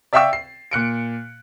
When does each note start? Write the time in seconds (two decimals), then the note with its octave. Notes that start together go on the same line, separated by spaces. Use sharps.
0.13 D5 E5 F5 G5 C#6 E6
0.33 C7
0.71 A#2 F#6 C#7 D7